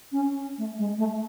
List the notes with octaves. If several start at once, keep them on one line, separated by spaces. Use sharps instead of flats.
C#4
A3
G#3
A3